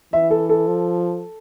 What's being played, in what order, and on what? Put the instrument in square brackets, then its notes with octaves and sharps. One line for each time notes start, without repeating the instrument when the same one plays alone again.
[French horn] E3 [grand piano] E5
[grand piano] A4
A4
[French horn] F3